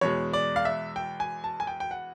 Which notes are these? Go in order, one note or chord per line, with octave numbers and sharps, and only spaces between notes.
E2 B2 G#3 C#5
D5
F5
E5
G5
G#5
A5
G#5
G5
G5
F#5